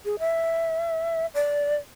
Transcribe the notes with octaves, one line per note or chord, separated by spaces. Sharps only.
G#4
E5
D5